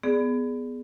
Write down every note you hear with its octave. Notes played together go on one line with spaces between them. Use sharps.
B3 G#4 D5